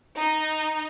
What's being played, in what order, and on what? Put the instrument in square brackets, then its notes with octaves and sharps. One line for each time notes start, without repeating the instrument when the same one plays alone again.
[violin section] D#4